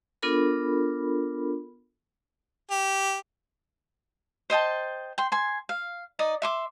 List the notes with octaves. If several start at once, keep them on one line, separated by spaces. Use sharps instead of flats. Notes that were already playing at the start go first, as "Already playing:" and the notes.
B3 D4 F4 A4 A#4 B5
G4
C5 D#5 G5 A5
G5 C6
G#5 C6
F5
D#4 D5 D#6
E5 C6 D6